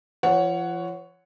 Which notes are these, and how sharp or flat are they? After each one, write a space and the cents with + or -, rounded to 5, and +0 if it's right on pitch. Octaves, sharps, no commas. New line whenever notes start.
F3 -35 C#5 +10 F#5 +0